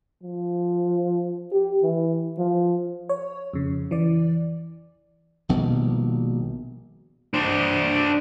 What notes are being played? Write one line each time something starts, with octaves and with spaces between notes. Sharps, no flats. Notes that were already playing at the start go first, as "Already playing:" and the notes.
F3
G4
E3
F3
C#5
F2 C#3
E3 D5
A#1 B2 D#3 G3
D4 C5